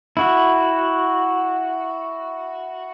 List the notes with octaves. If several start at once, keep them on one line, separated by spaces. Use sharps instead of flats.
E4 F#4